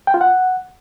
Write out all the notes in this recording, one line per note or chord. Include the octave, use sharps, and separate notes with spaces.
G5
F4
F#5